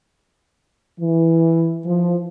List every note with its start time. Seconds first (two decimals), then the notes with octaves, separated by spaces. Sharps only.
1.00 E3
1.85 F3